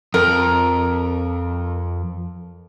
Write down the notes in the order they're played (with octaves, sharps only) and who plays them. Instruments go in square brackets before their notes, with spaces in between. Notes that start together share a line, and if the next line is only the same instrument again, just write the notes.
[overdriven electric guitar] F2 [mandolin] A#4